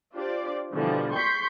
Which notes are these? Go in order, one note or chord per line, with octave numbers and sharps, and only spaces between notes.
D4 F4 G4 C5 D5
B2 D3 E3 F3 G3
C6 C#6 G6 B6 C7